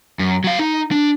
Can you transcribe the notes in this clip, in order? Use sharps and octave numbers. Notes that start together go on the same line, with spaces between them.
F#2
F#3 F5
D#4
D4